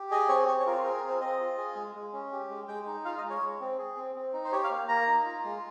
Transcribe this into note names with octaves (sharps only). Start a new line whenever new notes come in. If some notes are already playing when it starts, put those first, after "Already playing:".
Already playing: G4
G#4 D#5
C4 C#5
C4 C#5
C#5
F4 A#4
C5
G#4 A#4
A#4
C4
C5
C4 D#5
F4
G#4
G#3
G#3
C#4
G4
G#3
G#3 G5
D#4
F4 F5
D#5
G#3
C#5
G#3
C4
G#4
C4
C4
D#4
C5
G4 C#5
F5
A#3
A#3 A#5
D#4
F4
G#3